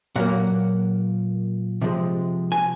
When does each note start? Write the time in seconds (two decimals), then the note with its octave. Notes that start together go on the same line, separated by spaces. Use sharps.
0.16 A#2 F#3 A#3 F#5
1.81 C3 F3 G#3
2.52 G#5